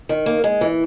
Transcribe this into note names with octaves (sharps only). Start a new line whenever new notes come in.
D#3
A#3
G#3
E3